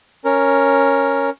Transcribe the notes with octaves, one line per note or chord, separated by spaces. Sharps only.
C#4 A#4